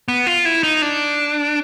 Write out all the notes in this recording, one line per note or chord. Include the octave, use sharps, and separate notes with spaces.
B3
F4
E4
D#4
D4